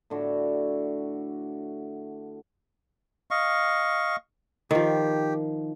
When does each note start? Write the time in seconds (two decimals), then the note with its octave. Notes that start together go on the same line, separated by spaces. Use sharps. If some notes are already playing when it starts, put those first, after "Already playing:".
0.10 A2 D3 F#4
3.31 D#5 F5 C#6
4.71 D#3 F3 G4